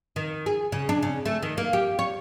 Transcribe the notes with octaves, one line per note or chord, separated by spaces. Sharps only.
D#3
G#4
C#3
D4
C#3
A3
D#3
A#3
G4
C#5